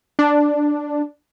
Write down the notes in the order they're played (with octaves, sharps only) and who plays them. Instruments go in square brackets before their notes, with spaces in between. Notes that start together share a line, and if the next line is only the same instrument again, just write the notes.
[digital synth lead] D4